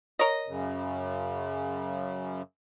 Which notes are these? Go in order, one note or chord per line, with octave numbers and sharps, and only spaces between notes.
A#4 C#5 D#5
F#2 C#3